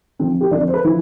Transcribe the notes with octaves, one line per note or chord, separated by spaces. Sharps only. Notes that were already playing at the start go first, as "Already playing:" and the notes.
F2 D3 F3 C4
G4
F2 D3 F3 D4
C5
B4
D3 F3 E4